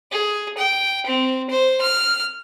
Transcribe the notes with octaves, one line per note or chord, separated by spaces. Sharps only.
G#4
G5
C4
C5
F6